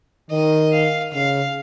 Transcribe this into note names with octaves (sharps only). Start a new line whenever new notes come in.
D#3 D#5
F5
C#3 F5